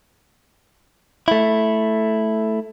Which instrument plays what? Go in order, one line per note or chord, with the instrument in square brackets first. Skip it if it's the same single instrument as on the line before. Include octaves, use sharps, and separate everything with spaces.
[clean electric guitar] A3 E4